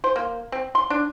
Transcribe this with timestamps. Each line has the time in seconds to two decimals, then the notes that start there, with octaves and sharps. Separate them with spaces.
0.04 C5
0.16 A#3
0.52 C4
0.75 C6
0.90 D4